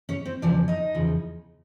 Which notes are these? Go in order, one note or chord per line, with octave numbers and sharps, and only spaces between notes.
C#4 C#5
C4 C5
E2 C#3 F3 D4 D5
D#4 D#5
E2 C#3 F3